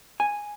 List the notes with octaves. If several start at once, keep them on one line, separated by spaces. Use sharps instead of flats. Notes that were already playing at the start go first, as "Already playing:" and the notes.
G#5